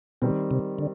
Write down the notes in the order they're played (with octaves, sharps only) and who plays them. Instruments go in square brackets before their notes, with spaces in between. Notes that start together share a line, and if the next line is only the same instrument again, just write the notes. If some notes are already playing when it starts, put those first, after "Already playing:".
[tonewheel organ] B2 [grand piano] D#3 G3 C4
[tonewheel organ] C3
D3